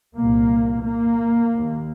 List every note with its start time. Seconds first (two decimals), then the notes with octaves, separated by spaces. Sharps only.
0.17 C2 A#2 A#3
0.85 A#3
1.55 D#2